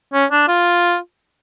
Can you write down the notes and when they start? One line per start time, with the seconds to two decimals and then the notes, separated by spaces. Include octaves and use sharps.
0.13 C#4
0.31 D4
0.48 F4